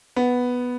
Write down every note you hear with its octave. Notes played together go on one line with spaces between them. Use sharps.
B3